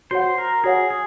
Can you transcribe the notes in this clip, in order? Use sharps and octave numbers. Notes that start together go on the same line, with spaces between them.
F#4 C5 C#5 F#5
A#4
F#4 G#4 C#5 F#5
G#4